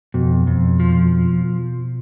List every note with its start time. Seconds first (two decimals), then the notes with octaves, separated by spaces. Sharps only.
0.14 F2 B2
0.47 F2
0.80 F3